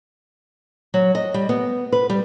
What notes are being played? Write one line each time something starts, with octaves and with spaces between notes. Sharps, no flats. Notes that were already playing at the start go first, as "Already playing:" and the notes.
F#3
D#5
G3
B3
B4
G3